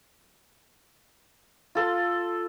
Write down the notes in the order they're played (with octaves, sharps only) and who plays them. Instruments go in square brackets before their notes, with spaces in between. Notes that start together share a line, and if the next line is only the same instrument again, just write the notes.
[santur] F4 A4 C6